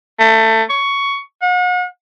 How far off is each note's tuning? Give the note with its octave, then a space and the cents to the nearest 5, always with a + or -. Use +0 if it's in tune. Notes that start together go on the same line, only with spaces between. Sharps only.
A3 +20
C#6 +10
F#5 -40